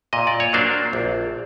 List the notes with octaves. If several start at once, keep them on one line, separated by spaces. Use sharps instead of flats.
A#2 D#5
D5
C#5
F#3 A#3 D4 C5 D5
A#1